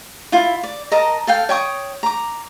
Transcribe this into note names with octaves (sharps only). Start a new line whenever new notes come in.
E4 F4
D5
A#4 D#5 A5 A#5
A4 F5 G5
C#5 G5 C#6 D#6
A#5 D6